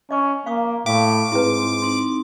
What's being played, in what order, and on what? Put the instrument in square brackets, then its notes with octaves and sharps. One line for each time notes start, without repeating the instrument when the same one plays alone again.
[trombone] C#4 [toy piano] D#5 D6
[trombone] A#3 [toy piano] F5 C#6 D#6
[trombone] A2 [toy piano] F5 [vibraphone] G5 [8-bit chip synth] D6
[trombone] G#2 [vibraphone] C4 [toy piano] E4 G#4 B4
[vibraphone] C4 D#4